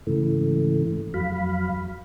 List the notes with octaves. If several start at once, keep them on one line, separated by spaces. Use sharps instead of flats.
G#2 C#3 E3 A3
F2 F#3 F5 B5